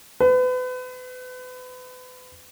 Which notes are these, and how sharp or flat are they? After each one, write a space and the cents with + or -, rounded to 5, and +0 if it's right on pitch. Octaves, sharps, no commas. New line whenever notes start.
B4 +35